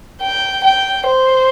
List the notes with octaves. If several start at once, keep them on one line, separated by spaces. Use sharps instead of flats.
G5
G5
C5